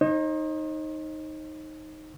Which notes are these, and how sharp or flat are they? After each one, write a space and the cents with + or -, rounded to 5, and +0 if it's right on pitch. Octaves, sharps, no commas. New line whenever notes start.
D#4 +0 C5 +45